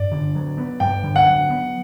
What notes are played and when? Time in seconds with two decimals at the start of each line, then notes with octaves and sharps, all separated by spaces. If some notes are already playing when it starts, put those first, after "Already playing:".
Already playing: G2 D5
0.11 D3
0.35 F#3
0.58 B3
0.80 G2 G5
1.03 D3
1.16 F#5
1.27 F#3
1.50 B3